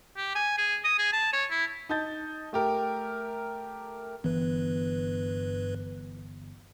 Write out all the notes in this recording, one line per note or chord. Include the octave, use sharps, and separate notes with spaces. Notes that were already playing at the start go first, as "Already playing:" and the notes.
G4
G#5
G#4
D#6
G#4
A5
C#5
E4
D#4 A5 G6 A6
A3 G4 A#4
G1 G2 E3 B3 B4